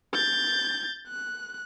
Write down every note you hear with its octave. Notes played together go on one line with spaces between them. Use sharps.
G6 A6
F#6